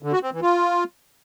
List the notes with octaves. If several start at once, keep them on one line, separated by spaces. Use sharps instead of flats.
D3
F#4
C4
E3
F4